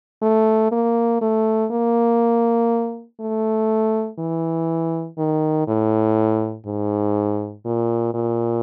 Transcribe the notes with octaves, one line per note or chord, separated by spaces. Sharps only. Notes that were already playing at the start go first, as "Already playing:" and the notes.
A3
A#3
A3
A#3
A3
E3
D#3
A2
G#2
A#2
A#2